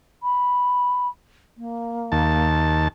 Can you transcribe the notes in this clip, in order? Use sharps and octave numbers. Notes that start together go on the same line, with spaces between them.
B5
A#3
D#2 A5